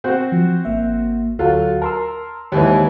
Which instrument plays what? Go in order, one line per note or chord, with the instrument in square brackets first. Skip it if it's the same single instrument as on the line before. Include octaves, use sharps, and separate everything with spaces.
[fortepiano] C4 F#4 C5
[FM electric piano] F3
G#1 A#3 E5
[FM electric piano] D2 F#5 [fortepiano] F#3 F4 A4
[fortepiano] A#4 [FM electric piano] A5 C6 E6
[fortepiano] D#2 G#2 E3 [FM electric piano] C#5 E5